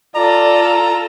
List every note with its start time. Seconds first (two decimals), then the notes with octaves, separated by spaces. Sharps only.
0.15 F4 A4 D5 A#5